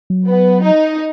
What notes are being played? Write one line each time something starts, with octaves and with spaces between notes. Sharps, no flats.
F#3
B3
D#4